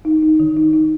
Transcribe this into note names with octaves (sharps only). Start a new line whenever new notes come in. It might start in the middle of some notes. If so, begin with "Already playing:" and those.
D#4
D#4
D#3
D#4
D#4